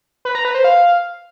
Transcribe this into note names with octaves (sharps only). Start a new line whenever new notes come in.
B4
A#5
B4
C5
F5